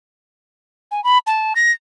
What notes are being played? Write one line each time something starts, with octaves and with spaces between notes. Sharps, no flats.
G#5
B5
A5
A#6